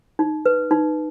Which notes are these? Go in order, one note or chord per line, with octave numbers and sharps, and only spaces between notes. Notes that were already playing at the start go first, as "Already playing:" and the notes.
D#4
B4
D#4